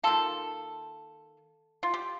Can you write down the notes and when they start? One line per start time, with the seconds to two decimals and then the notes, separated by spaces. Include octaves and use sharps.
0.03 D#3 A#3 F4 A4
1.83 F4
1.94 G4